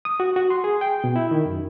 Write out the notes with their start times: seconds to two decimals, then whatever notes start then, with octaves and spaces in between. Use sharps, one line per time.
0.05 D#6
0.20 F#4
0.36 F#4
0.50 C6
0.64 G#4
0.81 G5
1.04 B2
1.16 E4
1.31 D#3
1.46 F#2